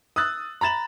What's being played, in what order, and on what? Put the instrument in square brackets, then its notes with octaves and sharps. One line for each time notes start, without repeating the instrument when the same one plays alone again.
[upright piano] D#6 E6 F#6 A6
A#5 B5 A6 E7 F#7